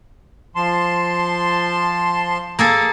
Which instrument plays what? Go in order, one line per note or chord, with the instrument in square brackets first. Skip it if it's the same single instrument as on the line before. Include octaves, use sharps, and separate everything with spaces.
[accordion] F3 A5 C6
[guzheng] A#3 G#4 A4